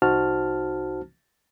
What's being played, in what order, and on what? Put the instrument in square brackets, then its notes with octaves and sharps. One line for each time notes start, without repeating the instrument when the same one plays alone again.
[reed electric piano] C2 D#4 F#4 C5 A5 F6